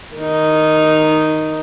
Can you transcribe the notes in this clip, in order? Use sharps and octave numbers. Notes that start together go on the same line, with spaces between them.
D#3 D#4